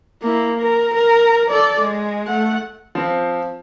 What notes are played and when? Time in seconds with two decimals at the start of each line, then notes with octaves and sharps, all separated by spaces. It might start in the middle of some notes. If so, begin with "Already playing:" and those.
0.22 A#3 E4
0.60 A#4
0.94 A#4
1.50 A4 D5
1.79 G#3
2.27 A3 F#5
2.95 F3 C4